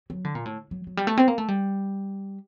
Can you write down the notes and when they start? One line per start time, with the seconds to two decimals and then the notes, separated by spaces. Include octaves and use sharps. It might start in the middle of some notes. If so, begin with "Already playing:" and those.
0.10 F#3
0.24 D3
0.35 A#2
0.45 A2
0.71 F#3
0.87 F#3
0.97 G3
1.07 A3
1.17 C4
1.28 A#3
1.38 A3
1.48 G3